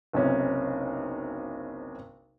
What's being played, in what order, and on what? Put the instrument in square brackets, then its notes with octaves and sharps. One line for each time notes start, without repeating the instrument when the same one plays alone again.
[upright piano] F#1 B1 C3 C#4